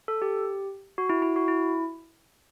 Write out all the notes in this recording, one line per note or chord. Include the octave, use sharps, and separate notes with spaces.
A4
G4
F#4
E4
E4
F#4
E4